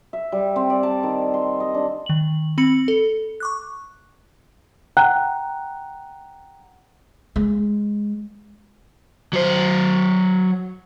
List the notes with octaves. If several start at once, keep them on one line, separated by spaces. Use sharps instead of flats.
E5
G3
C4
D5
A5
D#3
C6
D#5
D4
D#3 F#7
C4 B5 C#7 F#7
A4
C#6 D6 F#6
F#5 G5 A#5 F#6
G#3
F#3 C5